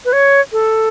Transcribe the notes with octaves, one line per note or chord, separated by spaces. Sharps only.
B4
C#5
A4